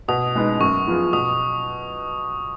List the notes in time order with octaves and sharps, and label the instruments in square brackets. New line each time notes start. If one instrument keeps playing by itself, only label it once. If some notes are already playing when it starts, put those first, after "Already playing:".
[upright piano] B2 [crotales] D#6
[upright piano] G#3 B3 D#4
[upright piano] F#2 [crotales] C#6
[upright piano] F3 B3 F4 G#4
[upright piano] B2 [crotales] D#6